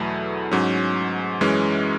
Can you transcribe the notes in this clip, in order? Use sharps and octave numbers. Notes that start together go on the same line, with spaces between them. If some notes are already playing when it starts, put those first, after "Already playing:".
Already playing: E2 B2 F#3 A3 E4
G#2 F#3 C#4
F#2 E3 G#3 C#4